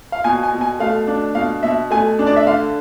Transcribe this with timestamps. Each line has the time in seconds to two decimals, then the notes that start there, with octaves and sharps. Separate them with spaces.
0.12 F5
0.24 B2 G#5
0.43 G#5
0.53 B2
0.61 G#5
0.80 A3 F5
1.07 D4
1.35 B2 F5
1.63 B2 E5
1.91 A3 G#5
2.19 D4
2.27 D5
2.36 E5
2.47 D3 F5